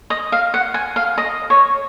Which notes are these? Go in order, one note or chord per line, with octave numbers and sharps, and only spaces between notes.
D#5
F5
F#5
G#5
F5
D#5
C#5